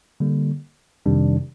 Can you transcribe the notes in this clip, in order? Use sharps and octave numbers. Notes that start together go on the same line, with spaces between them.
D3 G3 A#3
F2 C3 D#3 G3 D4